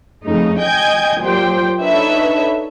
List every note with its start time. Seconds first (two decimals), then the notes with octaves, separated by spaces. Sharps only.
0.25 F2 C#3 A3 D#4
0.60 D#5 G5 G#5 G6 G#6
1.21 A#2 F#3 G4 C5 G5
1.82 D4 D#4 A4 B4 C#5 E5